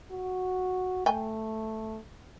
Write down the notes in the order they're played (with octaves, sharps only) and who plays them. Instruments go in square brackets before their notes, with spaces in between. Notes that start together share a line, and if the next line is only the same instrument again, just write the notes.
[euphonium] F#4
[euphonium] A3 [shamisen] G5 G#5